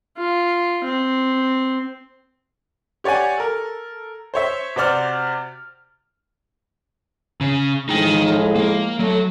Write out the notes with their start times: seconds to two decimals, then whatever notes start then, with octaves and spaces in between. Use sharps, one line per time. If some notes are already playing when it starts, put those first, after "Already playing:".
0.18 F4
0.84 C4
3.04 G4 C#5 D5 F#5 G#5
3.38 A4 A#4
4.34 C5 C#5 E5
4.76 C3 F#4 C5 D5 F6
7.41 C#3
7.89 A2 F3 G#3 D#4 G5
8.55 A#3
8.99 F#3 A3